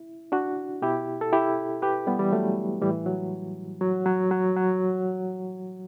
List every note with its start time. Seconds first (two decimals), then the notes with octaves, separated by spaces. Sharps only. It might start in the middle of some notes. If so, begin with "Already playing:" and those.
Already playing: E4
0.32 D4 F#4
0.82 B2 E4 G4
1.21 A4
1.32 E4 G4
1.82 G4 B4
2.07 G3 B3
2.19 E3 G3
2.33 F#3 A3
2.81 A2 E3 G3
3.06 F#3
3.81 F#3
4.06 F#3
4.31 F#3
4.57 F#3